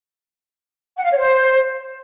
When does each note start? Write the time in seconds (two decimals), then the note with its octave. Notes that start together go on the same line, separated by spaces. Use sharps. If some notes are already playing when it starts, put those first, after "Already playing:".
0.97 F#5
1.04 F5
1.11 C#5
1.18 C5